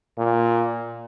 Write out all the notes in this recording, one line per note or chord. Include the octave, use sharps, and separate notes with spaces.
A#2